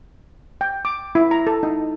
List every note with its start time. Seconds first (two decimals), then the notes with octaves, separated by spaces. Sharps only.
0.61 G5
0.85 D6
1.15 E4
1.31 A#5
1.47 A4
1.63 D#4